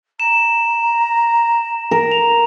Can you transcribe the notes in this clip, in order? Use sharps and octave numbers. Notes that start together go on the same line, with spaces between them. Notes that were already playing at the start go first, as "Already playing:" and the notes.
A#5 E7
A#4
F7